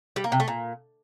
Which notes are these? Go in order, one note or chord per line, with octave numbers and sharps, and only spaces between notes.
G3
A#3
C3
A3
A#2